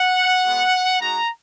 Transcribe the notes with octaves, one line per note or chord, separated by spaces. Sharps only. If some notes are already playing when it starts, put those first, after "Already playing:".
Already playing: F#5
G#3 B3 F#4
G#3 D#4 F#4 A#5